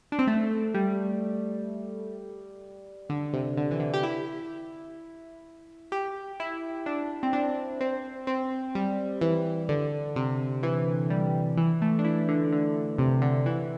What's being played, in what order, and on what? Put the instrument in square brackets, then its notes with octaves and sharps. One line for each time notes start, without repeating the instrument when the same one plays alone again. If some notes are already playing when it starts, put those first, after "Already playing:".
[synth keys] D4
C4
A3
G3
D3
C3
D3
E3
D3
G4
E4
G4
E4
D4
C4
D4
C4
C4
G3
E3
D3
C3
E3
G3
E3
A3
D4
E4
D3
D3
C3
D3
E3